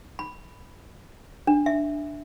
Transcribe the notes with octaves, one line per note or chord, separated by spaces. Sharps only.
B5
D4
E5